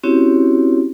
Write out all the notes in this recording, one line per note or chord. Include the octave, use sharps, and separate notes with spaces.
C4 C#4 E4 F#4 G4 C#5